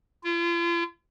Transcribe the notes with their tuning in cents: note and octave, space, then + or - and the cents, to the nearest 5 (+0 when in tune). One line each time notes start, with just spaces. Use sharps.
F4 -40